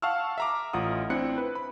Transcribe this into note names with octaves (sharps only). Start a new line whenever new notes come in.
F5 F#5 A5 C#6 E6 F6
E5 A#5 D6
A1 F4 F#5 D#6
C4 D4 E4 F#6 C#7
B4
B5